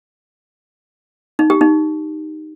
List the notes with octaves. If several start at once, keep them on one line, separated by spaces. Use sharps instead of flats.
D#4
G4
D#4